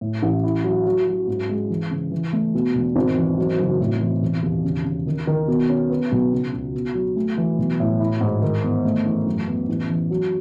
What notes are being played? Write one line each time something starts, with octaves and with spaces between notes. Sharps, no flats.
A2
A1
E4
F#3
F#3
F#3
G#2
G#3
E3
C#3
E3
A3
B2
E1
G#1
E3
F#3
F#1
A2
E3
E1
D#2
C#3
C#3
D#3
D#3
B2
C#4
B3
B1
C#3
C#2
B2
F#3
A3
E3
B1
A2
E4
G#2
D#3
E2
A3
A1
F#2
B3
A1
E3
F#3